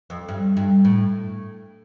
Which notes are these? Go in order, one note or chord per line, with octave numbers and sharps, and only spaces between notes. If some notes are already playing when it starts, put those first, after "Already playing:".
F2
G2
G2
A2